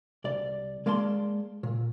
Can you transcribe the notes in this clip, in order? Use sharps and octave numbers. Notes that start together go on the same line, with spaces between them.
C2 D5
G#3 A#3 D5 A5 C6
A#2